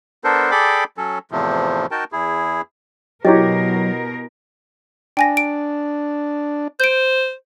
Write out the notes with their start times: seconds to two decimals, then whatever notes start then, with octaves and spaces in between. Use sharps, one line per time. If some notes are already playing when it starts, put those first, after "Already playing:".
0.24 B3 D4 A4 A#4 C5
0.51 G#4 A4 D5 G5 B5 D6
0.97 F#3 C#4 A4
1.31 E2 A2 C3 F3
1.91 D#4 F#4 A#4 G5 A5
2.12 E2 E4 G#4
3.25 B2 F#3 E4 F#4 G4 A#4 C#5 D#5
5.17 D4 G5 G#5 A#6
5.37 D7
6.80 C5 G6 D7